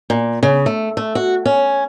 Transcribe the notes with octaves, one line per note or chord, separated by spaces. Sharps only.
A#2
C#3
A3
A3
F#4
C#4